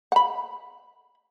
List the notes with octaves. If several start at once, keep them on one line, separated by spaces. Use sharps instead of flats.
F#5 B5